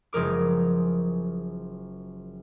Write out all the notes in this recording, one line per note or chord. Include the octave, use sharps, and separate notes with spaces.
F#1 F3 G#3 A#4 D6